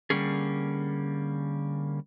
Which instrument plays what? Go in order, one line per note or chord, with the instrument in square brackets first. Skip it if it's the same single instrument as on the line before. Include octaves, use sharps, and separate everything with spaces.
[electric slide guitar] D3 G3 A#3 C#4 G#4